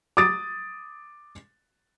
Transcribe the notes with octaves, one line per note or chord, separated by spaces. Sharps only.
D6 D#6 A6 D7